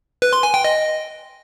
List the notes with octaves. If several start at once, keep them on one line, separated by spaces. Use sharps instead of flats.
B4
C6
G#5
G5
D#5